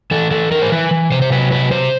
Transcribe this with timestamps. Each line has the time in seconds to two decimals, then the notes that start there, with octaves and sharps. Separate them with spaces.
0.11 E3 A4
0.31 E3 A4
0.51 E3 A#4
0.62 C5
0.72 E3 B4
0.91 E3
1.12 C3 C5
1.22 C5
1.31 F#3 B4
1.52 C3 B4
1.71 C3 C5